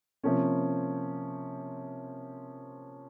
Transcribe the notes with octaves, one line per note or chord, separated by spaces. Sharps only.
C3 F3 A#3 C#4